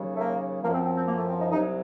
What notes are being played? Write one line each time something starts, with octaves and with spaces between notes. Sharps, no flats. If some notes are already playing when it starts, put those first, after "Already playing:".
Already playing: D#2 C#3 F#3
A3
A#3
F#2 F3 A#3
C4
C4
C4
A#3
A3
C4
D#4
C2 C3 F#3 D#4